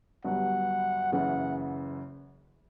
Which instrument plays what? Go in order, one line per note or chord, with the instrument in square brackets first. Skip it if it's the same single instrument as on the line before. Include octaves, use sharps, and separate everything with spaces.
[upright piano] G1 G2 F#3 [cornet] F#5
[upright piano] F#1 F#2 C#3 E3 [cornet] F#5